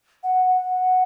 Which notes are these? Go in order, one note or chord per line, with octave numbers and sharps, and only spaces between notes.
F#5